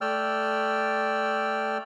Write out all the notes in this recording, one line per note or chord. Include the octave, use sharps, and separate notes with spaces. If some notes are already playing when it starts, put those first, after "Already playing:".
A3 D5 G5 E6 F6